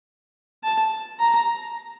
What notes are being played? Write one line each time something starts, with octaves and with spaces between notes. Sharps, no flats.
A5
A#5